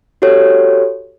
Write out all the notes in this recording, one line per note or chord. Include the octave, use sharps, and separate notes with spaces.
F#4 G4 A4 C#5